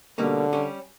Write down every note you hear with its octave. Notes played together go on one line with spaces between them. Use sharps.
B2 D3 G3 A#3 C#4
G3 C#4 G4